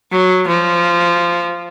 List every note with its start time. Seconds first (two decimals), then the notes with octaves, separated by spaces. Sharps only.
0.12 F#3
0.48 F3